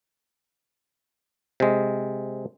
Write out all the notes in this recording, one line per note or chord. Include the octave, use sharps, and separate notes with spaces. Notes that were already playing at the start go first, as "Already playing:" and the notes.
C3 G#3